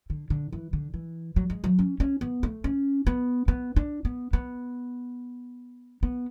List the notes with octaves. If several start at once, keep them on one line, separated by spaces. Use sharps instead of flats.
D3
D3
E3
D3
E3
F#3
G#3
F#3
C#4
C#4
B3
A3
C#4
B3
B3
D4
B3
B3
B3